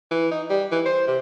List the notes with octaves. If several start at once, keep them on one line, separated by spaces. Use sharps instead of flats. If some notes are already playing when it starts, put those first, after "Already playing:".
E3
D#4
G3
E3
C5
C3